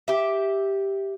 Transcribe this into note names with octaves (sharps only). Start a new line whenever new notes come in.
G4 E5